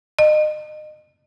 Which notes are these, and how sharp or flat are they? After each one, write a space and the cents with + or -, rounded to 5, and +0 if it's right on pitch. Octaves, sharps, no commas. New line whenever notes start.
D#5 -30